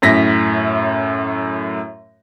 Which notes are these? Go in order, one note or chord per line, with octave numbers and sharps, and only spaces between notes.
F#2 A2 A#6 B6